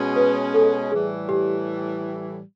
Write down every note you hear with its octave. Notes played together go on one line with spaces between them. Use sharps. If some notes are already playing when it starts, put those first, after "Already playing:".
Already playing: B2 G#3 C#4
B4
A4
A2 E3 G3 G#4
G4